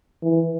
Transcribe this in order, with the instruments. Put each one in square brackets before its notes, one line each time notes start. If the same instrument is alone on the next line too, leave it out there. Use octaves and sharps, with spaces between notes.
[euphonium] E3